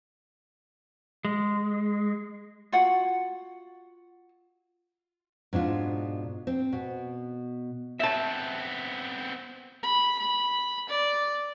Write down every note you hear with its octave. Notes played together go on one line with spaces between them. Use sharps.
G#3
F4 F#4 F#5
G#2 B2 D4 F4
C4
B2
B3 C4 E5 A5
B5
B5
D5